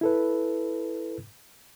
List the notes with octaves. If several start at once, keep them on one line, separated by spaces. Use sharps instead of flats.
E4 A4 B4